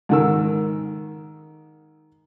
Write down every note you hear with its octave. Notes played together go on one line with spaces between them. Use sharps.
G#2 D#3 E6